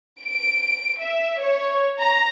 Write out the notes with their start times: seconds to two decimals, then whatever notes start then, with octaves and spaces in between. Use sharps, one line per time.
0.24 D7
1.01 E5
1.40 C#5
2.00 A#5